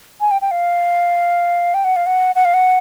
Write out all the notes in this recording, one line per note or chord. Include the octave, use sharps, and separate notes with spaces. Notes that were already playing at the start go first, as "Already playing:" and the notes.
G#5
G5
G5
F5
G5
F#5
F5
F#5
F#5
F5
F#5